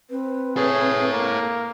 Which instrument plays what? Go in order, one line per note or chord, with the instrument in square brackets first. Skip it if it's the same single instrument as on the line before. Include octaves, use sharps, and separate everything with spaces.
[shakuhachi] C4 [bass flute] B4
[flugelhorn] G#4 [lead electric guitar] A4 C#5
[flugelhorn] A#3